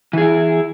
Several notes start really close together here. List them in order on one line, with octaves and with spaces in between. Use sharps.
E3 G#4 E4